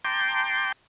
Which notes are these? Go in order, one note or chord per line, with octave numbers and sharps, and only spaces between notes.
G5 A5 A#5 C6 D6 G6